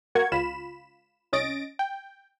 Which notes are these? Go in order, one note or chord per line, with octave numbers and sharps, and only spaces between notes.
A#3 F#4 A#4 C#6 G#6
C#2 F4 B5 E7
C2 C#4 D#5 A6 A#6 D7
G5